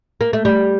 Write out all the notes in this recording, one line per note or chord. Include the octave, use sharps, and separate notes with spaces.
A#3
A3
G3